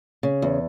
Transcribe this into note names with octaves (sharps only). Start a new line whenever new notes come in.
C#3
E2